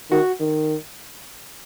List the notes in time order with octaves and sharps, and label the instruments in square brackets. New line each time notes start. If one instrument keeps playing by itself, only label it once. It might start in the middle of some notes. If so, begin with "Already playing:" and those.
[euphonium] D#3 [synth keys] F#4
[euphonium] D#3